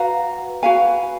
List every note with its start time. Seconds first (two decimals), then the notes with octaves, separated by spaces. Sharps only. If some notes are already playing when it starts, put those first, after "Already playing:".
Already playing: F#4 B4 F5 A#5
0.63 F#4 B4 F5 G#5